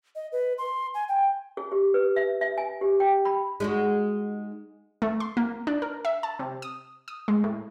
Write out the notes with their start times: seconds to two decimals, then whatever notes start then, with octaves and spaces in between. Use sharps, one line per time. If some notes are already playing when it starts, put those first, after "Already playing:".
0.15 D#5
0.32 B4
0.58 C6
0.94 G#5
1.08 G5
1.57 G#4
1.72 G4
1.94 B4
2.16 E5
2.41 E5
2.58 G#5
2.81 G4
3.00 G5
3.25 B5
3.60 G#3 D#4 F#4
5.02 A3
5.20 C6
5.37 A#3
5.67 D4
5.82 A#4
6.05 E5
6.23 A5
6.39 C3
6.62 D#6
7.08 D#6
7.28 G#3
7.44 A2